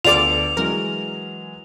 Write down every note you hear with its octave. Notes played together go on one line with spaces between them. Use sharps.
D2 B3 F4 A4 D5 D6 F7
E3 F#3 G#3 A#4